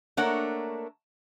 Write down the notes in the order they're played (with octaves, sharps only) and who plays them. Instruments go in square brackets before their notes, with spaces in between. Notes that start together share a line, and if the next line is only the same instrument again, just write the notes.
[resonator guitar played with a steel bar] A3 A#3 D4 A#4 C#5 F#5